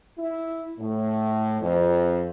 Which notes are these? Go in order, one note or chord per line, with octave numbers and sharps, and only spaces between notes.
E4
A2
F2